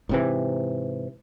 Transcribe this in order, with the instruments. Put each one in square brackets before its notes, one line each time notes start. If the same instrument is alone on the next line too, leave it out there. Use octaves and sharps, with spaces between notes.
[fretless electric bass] G#2 C3 E3